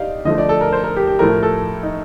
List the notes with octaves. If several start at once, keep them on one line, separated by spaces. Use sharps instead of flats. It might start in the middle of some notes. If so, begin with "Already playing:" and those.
Already playing: D#4 G4 D5 F5
D3 F3 A3 D#5
D5
A4
A#4
C5
A#4
G4
G4
A2 F3 A3 A#4
A4
D#4